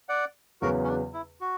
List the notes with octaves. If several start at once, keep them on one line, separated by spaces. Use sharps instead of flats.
D5 F#5
E2 C#3 F#3 B3 F#4 A#4
C#4
D4
E4
F#4